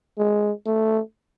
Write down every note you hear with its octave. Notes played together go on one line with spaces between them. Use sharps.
G#3
A3